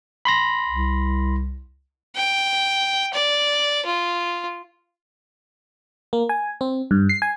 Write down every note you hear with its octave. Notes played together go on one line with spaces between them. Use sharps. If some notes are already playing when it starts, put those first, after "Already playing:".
B5 C6 A#6
C2
G5
D5
F4
A#3
G#5
C4
G2
C7
G#5